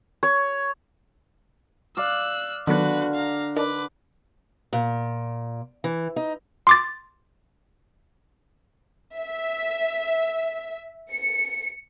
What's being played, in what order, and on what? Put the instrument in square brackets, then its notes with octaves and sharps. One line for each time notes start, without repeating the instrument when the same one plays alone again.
[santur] C#5
[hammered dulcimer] D5 F5 [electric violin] E6 F#6
[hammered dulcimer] D3 [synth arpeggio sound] D#3 F#3 B3 [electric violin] F#4 B4
[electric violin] F5 A#5
[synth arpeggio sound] D4 D#4 A#4 [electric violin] B4 D6
[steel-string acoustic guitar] A#2
E3
D#4
[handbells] C6 D6 A6
[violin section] E5
C#7